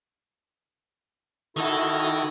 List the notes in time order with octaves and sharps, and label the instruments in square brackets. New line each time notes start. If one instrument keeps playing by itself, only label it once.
[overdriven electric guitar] D#3 D#4 [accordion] E4 F#4 A4